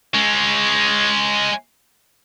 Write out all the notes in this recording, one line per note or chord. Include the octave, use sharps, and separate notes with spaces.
G#3 C#4